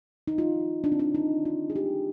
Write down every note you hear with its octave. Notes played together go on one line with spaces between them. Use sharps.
D#4
F4
D4
C4
D4
D#4
F4
G#4
G4